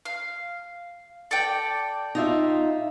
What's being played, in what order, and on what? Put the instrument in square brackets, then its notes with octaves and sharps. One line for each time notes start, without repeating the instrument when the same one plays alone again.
[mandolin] F5
A4 D5 G5
[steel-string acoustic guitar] D#4 F4 E5